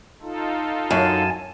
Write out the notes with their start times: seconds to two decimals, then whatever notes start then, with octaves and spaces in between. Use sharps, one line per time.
0.22 D#4 F4 A4
0.91 F#2 G#5 A5